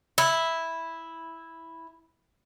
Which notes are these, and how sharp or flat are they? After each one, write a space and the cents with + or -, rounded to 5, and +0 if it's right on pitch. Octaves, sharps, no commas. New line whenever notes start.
E4 -5